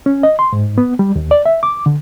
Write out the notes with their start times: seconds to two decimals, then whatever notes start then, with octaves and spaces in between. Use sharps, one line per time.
0.06 C#4
0.23 D#5
0.39 C6
0.53 G#2
0.78 B3
0.99 G3
1.16 D#2
1.31 D5
1.46 E5
1.63 D6
1.86 D3